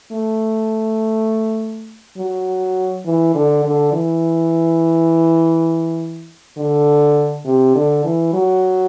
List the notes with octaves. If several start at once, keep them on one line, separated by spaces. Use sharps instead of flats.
A3
F#3
E3
D3
D3
E3
D3
C3
D3
E3
F#3